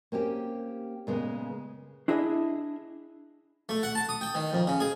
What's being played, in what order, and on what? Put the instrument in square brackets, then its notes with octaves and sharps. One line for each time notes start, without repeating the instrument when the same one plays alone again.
[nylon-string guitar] A#3 C4 C#4 G4
A#2 C#3 G#3 B3
[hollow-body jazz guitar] D4 E4 G#4 D#5 E5
[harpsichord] A3
F#5
A5
D#6
G5
D#3
F2
C#3
G#4